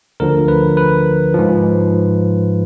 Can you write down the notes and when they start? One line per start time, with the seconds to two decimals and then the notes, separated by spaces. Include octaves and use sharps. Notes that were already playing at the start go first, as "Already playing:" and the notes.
0.20 D2 D3 F3 A#4
0.48 B4
0.77 B4
1.34 G#2 F3